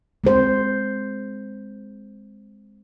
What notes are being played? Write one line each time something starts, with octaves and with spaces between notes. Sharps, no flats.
G#3 C4 C5